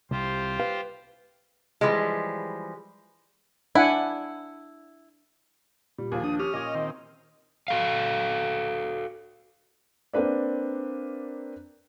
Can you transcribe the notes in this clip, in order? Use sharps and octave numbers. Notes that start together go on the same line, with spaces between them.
C2 F4 G4 C5
B4 F5
E3 F3 G3 G#3
D4 E4 F#5 G#5
A#2 G3
D#2 F3 G#4
D4 D#6
C#4 G4 D#6 F6
A#2 D#5 D6 G#6
D#3 C4
F#4 A4 F5
A#3 C4 D4 B4 D5